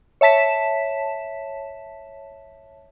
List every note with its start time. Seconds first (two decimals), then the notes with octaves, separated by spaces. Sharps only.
0.21 C#5 E5 A5 B6 E7